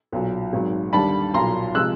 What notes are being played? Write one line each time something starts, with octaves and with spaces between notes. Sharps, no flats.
B1 A#2 F#3
G#1 G#2 D#3 F#3
D#2 D3 G3 A5 B5
B1 A#2 F#3 A#5 C6
C3 F3 G#3 E6 F#6